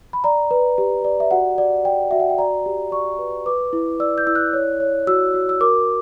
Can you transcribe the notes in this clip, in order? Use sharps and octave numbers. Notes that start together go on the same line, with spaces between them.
B5
D5 A#5
B4
G4
D5
E5
F#4 F#5
D5
D5 G5
F#4 E5
F#5
G5
D5 A#5
G4
D5 C#6
B4
B4 D6
E4
D5 E6
G6
E4 E6
F#6
C#5
C#5
F#4 E6
F#4
E6
A#4 D6